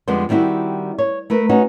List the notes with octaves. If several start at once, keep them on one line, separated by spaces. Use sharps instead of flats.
F2 D3 G3 G#3 B3 C5
D#3 G3 C4 E4 F#4
C#5
A3 A#4 B4
C#4 D#4 F#4